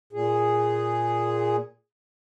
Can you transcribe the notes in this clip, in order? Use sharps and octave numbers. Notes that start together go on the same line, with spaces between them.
A#2 G#4